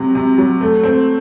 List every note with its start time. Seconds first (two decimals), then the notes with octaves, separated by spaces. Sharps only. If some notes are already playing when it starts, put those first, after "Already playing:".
Already playing: C3 F#3
0.15 C3
0.38 F#3
0.61 A3
0.83 C4